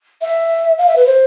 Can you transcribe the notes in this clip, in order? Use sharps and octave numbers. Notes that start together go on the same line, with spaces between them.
E5
F5
E5
B4
C5